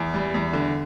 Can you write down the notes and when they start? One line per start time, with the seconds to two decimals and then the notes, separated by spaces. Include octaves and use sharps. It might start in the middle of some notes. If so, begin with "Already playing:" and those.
Already playing: E2
0.14 G3
0.34 E2
0.53 D3